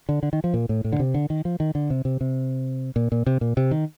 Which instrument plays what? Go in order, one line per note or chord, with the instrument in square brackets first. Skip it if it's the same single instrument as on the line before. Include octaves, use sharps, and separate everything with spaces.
[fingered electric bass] D3
D3
D#3
F3
A#2
A2
A2
D3
C3
D3
D#3
F3
D#3
D3
C3
C3
C3
A#2
A#2
C3
A#2
C3
D#3